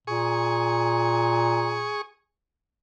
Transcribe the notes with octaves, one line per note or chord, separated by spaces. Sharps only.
A#2 G#4 C#6